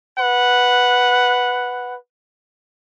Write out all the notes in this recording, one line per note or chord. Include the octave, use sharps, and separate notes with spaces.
B4 F#5